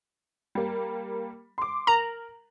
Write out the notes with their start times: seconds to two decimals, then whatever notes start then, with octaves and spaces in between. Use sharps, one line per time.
0.55 G3 A#3
1.58 C6 D6
1.87 A#4 A#5 F#7